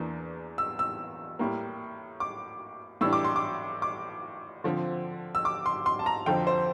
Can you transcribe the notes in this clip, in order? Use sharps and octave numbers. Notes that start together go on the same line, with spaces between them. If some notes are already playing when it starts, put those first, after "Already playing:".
Already playing: E2 E3 A#3 D4
E6
E6
A2 G3 A#3
D6
A2 E3 G3 D4 E6
D6
C6
D6
D6
D3 F3 C4
E6
D6
C6
C6
A5
A#5
F2 D3 F3 C4 G5
C5